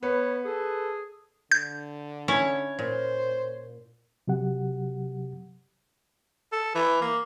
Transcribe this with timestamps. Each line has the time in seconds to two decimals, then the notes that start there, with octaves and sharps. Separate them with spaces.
0.03 B3 B4 C#5
0.45 G#4 A4
1.52 D3 G6
2.28 C#4 E4 C#5
2.79 A#2 C5
4.28 C3 F#3 G4 F#5
6.52 A4
6.75 E3
7.02 A#3